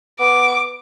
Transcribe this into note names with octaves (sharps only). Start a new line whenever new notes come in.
B3 D6